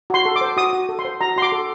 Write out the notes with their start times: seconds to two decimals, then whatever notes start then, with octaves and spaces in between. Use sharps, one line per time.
0.10 F#4 C6
0.25 A4
0.36 D6
0.41 C5
0.57 F#4 D#6
0.73 F#4
0.89 A4
0.99 C6
1.05 C5
1.21 F#4 A#5
1.36 F#4 C6
1.42 D6
1.52 A4